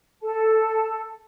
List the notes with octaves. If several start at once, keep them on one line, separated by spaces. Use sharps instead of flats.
A4 A5